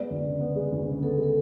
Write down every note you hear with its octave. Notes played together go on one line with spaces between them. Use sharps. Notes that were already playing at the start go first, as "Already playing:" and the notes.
Already playing: G#3 B3 D5
D2
C#3
B3
G#3
D2
C#3
B3 A4
G#3
A4